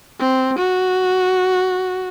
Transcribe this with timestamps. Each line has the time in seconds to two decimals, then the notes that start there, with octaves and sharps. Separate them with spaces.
0.20 C4
0.58 F#4